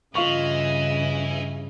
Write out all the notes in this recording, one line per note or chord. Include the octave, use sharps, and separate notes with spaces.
G2 C#3 E3 F4 D#5 C#6